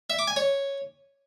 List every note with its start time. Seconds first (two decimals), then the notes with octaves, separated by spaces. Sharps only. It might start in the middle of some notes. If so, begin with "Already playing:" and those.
0.10 E5
0.19 D6
0.27 G#5
0.36 C#5